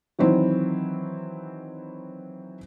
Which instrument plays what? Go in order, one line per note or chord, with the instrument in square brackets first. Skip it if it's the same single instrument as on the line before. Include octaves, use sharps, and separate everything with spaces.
[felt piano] D#3 E3 F#3 C4 D#4 E4